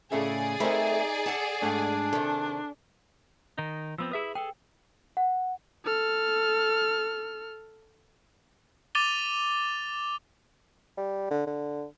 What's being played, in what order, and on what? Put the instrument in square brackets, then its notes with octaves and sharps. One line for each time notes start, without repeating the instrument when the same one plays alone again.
[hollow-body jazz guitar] A2 A4 E5 [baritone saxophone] C#3 [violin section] G#4 D5
[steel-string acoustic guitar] A3 C4 [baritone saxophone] D#4 [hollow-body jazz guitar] A#4 C5 B5
[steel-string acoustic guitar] A4 F#5 A5
[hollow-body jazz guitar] G#2 A3 [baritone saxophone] D4
[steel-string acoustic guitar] C3 D#3 [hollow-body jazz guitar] A4
[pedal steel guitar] D#3 D#4
[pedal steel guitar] F3 B3 C4 [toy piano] E6
[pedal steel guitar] E4 E5 D#6 [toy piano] G#4 B4
[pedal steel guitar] G#4 A4 [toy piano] G5
[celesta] F#5
[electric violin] A4 F6
[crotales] D6 A6 D#7 F7 G7
[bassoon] G3
D3
D3